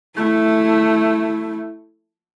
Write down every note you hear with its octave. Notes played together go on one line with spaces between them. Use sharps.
A3 E4